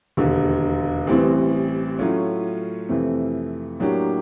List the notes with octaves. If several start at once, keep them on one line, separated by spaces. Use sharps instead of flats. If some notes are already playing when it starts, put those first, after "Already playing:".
E1 D#2 D3
A1 A2 E3 G3 C4
A2 F#3 A3 C#4 F4
F2 C3 E3 A3
A2 F#3 A#3 D4 G4